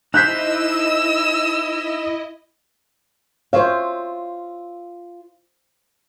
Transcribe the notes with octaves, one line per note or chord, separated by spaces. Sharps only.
D#4 E4 C5 D#5 E6 F#6 G6 B6
F4 C5 C#5 E5 F5